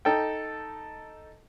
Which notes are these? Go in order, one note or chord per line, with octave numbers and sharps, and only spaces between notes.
D#4 A4 G5